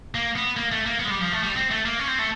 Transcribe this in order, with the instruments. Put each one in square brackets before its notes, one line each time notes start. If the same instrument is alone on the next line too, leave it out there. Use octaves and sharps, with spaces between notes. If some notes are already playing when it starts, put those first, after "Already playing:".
[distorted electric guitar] A#3
B3
A#3
A3
A#3
B3
G#3
G3
F3
A3
G3
C4
A3
A#3
C#4
C4
A3